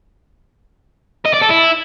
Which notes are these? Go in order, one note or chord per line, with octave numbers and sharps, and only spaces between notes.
D#5
D5
A4
E4